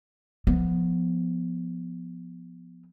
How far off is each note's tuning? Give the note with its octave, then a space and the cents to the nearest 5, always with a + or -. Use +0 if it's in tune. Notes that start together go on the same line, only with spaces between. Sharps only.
F3 +0 B3 +0